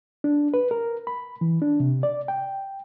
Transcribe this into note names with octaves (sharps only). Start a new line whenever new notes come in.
D4
B4
A#4
B5
E3
D4
C3
D5
G5